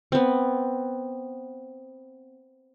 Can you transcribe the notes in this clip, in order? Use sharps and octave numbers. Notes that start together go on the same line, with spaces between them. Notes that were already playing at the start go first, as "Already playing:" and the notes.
B3 C4